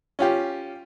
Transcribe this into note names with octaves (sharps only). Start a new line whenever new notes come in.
C#4 F4 G4